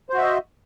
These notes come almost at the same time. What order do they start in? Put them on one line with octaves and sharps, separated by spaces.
C5 F#4 E5 D#5